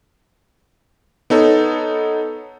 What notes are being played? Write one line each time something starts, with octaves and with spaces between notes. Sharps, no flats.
B3 D#4 A4 C#5